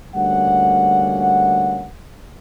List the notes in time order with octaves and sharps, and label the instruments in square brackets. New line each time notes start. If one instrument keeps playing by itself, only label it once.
[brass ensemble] D2 G3 A#3 C#4 F#5